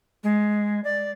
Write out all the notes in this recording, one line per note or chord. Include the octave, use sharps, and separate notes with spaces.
G#3
D5